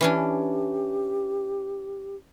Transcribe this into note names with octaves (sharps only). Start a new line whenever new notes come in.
E3 C#4 D4 G4